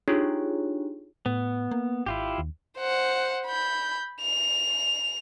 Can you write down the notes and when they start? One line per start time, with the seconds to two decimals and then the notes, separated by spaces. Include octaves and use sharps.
0.08 D4 D#4 F4 G4 G#4 C#5
1.26 A2 B3
1.71 A#3
2.06 G#1 E4 F4 G4
2.38 D#2
2.78 C5 F#5
3.46 B5 G6
4.22 F7